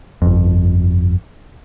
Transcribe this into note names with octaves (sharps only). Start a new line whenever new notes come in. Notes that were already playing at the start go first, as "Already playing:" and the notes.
G1 F2